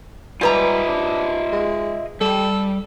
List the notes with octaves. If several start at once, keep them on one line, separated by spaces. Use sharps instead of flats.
G#2 G3 F4 B4 D#5 E5 A#5
D4
G#3
G3 A4